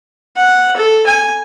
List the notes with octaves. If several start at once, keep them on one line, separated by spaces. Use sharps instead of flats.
F#5
A4
G#5